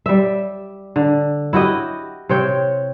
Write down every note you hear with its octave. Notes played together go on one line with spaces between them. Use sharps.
G3 E5
D3
E4 F#4 G4 D#5
C3 C4 C#5 G5